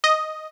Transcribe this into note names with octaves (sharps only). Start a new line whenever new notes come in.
D#5